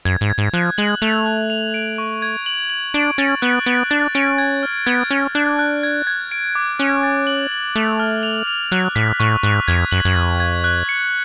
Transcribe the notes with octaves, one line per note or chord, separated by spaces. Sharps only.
F#2 G#6
G#2
G#6
G#2
F3 F#6
G#3 F#7
A3 F7
F#6
F7
D7
C#6
G#6
F#7
F#7
D4 D7
C#4 A6
B3 F#6
B3 D7
D4 A6
C#4 D7
G#6
F6
B3 G#6
C#4 G#6
D4 F#6
F#6
G#6
G#6
D7
D6
C#4 F#6
A6
F#7
F#7
A3 F7
F6
F7
F7
F#3 F#6
A2 B6
A2 C#6
G#2 F#6
F2 G#6
F#2 F#7
F#2
F2 G#6
G#6
F#6
C#7